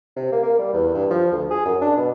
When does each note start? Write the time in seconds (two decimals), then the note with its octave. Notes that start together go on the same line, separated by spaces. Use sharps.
0.17 C3
0.32 A#3
0.43 A#3
0.59 G3
0.74 E2
0.95 G2
1.11 F3
1.32 D2
1.51 G#4
1.65 F#2
1.82 D4
1.97 B2